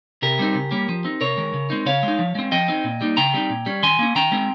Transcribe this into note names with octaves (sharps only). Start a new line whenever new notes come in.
C3 G4 A#4
G3 C4 D#4
C#3
G3 A#3 C#4
F3
C4 D#4
C3 A#4 C#5
D#3 G#3
C#3
G#3 C4 D#4
C#3 C#5 F5
G#3 D#4
F3
G#3 C4
F3 D#5 G5
C4 D#4
A#2
G3 A#3 D#4
C#3 G5 A#5
G3 C4 D#4
A#2
G3 C#4
D#3 G#5 C6
A#3 C#4
D#3 G5 A#5
G#3 C4